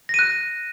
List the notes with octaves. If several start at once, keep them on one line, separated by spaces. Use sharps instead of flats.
F#6 A#6 D#7